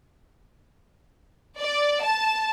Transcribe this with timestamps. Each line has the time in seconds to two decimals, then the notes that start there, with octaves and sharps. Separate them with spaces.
1.59 D5
2.02 A5